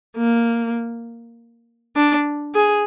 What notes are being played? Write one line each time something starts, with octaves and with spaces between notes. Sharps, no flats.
A#3
D4
G#4